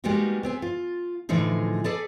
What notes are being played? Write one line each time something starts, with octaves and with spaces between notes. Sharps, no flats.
G3 G#3 A#3 B3 D#4 F#4
B3 C4 G#4
F4
A2 D3 E3 F3 D#4 G#4
G#4 A4 B4 D5 A5